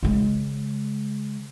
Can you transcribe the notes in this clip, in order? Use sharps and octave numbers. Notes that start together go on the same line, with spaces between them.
C#3 G#3